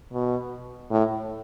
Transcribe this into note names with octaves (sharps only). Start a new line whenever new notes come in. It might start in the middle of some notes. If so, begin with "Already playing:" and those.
B2
A2